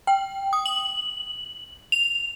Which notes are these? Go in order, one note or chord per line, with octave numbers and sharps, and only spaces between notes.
G5
D#6
F#7
F7